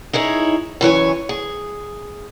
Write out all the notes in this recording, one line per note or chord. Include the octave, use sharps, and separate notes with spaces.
D#4 E4 G#4 C#5
F#2 E3 C#5 G#5
G#4